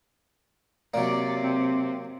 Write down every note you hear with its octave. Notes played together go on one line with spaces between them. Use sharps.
C3 F#3 A#3 D5
C4